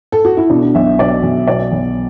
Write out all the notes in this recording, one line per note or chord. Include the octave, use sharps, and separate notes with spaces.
A4
F#4
E4
B2 D4
B1 E5
B2 D5
B1
B2 D5
B1